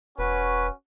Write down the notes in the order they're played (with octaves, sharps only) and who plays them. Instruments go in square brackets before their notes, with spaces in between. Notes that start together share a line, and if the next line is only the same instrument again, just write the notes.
[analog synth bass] E1 [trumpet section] C#4 F#4 [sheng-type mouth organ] B4